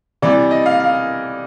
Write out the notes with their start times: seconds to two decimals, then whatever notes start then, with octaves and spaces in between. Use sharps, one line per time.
0.22 C3 E3 G3 D5
0.51 D#5
0.66 F5
0.80 F5